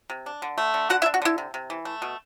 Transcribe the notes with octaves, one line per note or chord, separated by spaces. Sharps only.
C3
D4
D3
A3
D3
D3 F#4 F#5
E4 E5
D4
F#4
D3 E4
C3
C3
E3
A3
B2